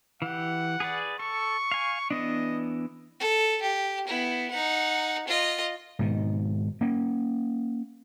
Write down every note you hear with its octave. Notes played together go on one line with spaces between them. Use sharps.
E3 G4 F#5
G#4 B4 D5
A4 C#6
F5 G#5
E3 B3 D4 D#5
A4
G4
B3 E4
D#4 F#5
F4 D#5
G#2 B2 D#3
A#3 C#4